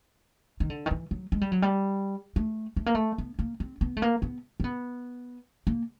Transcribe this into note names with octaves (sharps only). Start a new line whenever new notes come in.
D#3
D3
D#3
E3
F#3
G#3
G3
F#3
G3
A3
A3
A#3
A3
B3
A#3
C4
B3
A3
A#3
B3
C4
B3
A#3